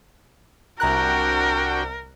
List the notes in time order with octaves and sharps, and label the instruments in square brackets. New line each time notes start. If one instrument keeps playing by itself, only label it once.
[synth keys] C2 A#5 F#6 [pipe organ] D4 F#4 G5 [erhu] A#4